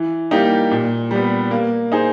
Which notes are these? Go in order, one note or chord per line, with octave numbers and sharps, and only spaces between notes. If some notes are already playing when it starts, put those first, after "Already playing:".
Already playing: E3
G3 A#3 D#4 G4
A#2
G3 B3
A#3
D#4 G#4 C5